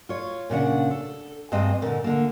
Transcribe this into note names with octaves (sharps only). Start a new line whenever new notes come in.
F4 C#5
A#2 C#3 D4 F#5
A4
G2 G#3 C4 D#5
A#2 D3
D3 A#3